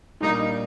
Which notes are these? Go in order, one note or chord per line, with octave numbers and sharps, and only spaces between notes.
A#2 G3 A#3 D4 D#4